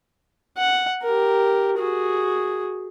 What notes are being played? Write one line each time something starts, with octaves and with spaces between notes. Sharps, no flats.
F#5
G4 A#4
F#4 G#4